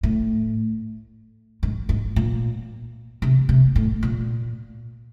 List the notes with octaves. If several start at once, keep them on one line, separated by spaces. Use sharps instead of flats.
A2
G#2
G#2
A#2
C3
C3
A2
A#2